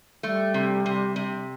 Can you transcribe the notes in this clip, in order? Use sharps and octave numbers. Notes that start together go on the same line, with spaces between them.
G3 A3
C3
C3
C3